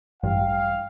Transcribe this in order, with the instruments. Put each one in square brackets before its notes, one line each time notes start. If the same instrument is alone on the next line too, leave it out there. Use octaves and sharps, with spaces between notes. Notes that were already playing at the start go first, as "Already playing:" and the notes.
[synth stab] A1 G2 [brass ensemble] F5 [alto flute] G5